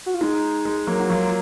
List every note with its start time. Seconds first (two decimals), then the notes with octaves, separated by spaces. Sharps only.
0.06 F#4
0.14 F4
0.21 G#3 D#4
0.65 G#3
0.87 F#3 A#3
1.00 F#4
1.09 F#3 A#3 F4